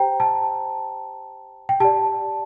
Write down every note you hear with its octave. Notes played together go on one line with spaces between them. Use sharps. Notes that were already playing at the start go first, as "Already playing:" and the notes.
Already playing: G4 C5 G5 A#5
A5
G5
G4 D5 A5